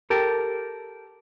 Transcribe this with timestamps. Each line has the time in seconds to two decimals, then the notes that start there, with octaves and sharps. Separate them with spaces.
0.10 G4 A4 A#4